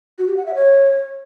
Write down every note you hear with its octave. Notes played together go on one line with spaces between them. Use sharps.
F#4
G4
F#5
E5
C#5